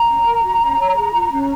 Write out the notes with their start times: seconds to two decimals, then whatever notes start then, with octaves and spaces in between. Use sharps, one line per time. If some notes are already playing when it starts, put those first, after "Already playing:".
Already playing: A#5
0.09 C#4
0.26 A#4
0.44 F#4
0.61 C#4
0.79 C#5
0.96 G#4
1.14 F4
1.32 C#4